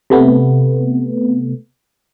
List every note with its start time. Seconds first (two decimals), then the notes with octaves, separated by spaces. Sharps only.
0.10 C3 A3 B3